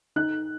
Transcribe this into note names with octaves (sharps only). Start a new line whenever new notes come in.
D#4 F#6